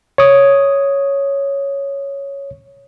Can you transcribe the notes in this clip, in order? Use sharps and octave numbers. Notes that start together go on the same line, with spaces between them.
C#5 D#6